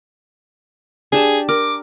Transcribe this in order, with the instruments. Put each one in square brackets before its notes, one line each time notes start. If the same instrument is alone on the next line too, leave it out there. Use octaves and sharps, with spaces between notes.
[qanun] D4 G4 A5 [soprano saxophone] G#4
[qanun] A#4 [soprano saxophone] D6